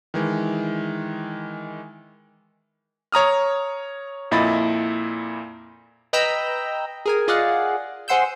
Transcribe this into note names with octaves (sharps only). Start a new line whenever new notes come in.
D#3 E3 G#3
C#5 A#5 D#6 F6
F2 A#2 E4 D#5 B5 A6
B4 D#5 G5 A#5 B5 E6
G#4 A#4 G#5
F4 G#4 D5 D#5 F5 F#5
G#4 C5 F#5 C6 E6 G6